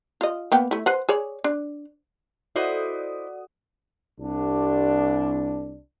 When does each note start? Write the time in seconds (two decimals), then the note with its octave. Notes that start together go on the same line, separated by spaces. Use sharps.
0.21 F4 D#5
0.52 A#3 B3 G5
0.71 A3 E4
0.86 B4 C5 F#5
1.09 G#4 C#5 D5
1.44 D4
2.56 E4 F#4 A4 C5 D5 D#5 F#5 D#6
4.19 C2 D4